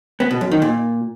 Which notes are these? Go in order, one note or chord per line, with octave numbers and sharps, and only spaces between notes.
B3
B2
F#2
D#3
A#2